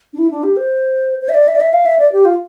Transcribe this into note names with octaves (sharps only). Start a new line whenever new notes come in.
D4
E4
D4
G4
C5
C5
E5
D5
E5
D5
E5
F5
E5
D5
G4
F4